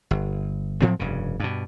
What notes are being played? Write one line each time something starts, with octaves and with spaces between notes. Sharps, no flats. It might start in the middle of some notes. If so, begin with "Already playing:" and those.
G1
A2 F3 F#3 C4
F1 G2 C#3
G2 B2